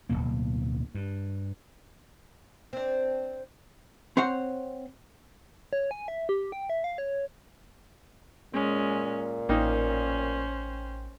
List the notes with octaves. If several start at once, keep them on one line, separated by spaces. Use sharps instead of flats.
D1 C#2 B2 A#3
G2
C4 D4
C4 C5 C#5 F#5
C#5
G#5
E5
G4
G5
E5
F5
C#5
A#2 G#3 C#4
A1 A#3 C#4 D#4 C5 G5